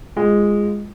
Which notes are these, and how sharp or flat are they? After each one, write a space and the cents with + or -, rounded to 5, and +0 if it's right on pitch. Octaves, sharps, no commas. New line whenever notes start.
G#3 -10 F4 +0